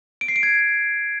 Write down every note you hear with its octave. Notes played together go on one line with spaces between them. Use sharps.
D7
C7
D7
G#6